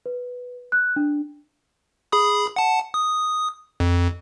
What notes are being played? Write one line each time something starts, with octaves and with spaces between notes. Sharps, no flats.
B4
F#6
D4
G#4 B5 D#6
F#5 A5
D#6
F2